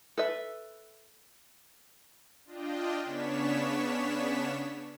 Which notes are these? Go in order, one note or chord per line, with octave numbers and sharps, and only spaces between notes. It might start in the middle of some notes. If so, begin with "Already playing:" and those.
A4 B4 E5
D4 F4 D#5 G5
C#3 B3 D4 C#5 B6 E7